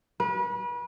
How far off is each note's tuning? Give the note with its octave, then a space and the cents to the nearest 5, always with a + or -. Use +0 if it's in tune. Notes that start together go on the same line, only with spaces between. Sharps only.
B4 -35